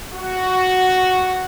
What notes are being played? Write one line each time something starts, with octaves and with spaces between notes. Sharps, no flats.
F#4